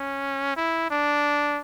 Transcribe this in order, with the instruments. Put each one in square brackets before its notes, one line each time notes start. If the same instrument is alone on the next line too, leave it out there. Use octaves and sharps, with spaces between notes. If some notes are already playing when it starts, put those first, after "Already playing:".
Already playing: [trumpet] C#4
E4
D4